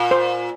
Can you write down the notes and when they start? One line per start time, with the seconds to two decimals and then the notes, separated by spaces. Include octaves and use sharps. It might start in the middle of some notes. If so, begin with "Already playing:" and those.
Already playing: A#2
0.11 C5